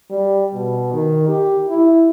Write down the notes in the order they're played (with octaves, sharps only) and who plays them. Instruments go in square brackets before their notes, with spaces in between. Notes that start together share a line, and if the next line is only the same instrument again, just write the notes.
[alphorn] G3
B2
D#3
G4
E4